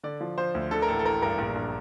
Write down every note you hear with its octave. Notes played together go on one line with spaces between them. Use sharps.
D3 D5
F3
F3 C5
D2
D3 A4
A#4
A1 A4
A4
A1 A#4
G2 A#4
A#1
A#1